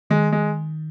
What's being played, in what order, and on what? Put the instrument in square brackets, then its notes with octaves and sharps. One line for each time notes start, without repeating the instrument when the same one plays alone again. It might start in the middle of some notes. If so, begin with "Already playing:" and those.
[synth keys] D#3 [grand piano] G#3
[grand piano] G#3